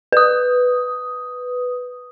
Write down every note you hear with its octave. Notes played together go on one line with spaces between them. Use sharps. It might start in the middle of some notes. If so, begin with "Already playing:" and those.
B4 D#6